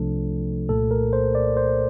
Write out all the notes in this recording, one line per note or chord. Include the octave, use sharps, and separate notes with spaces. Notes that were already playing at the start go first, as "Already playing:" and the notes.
Already playing: C2 C3 F3 A3 D4 A4
C2 A#2 A3 A4
A#4
C5
D5
C5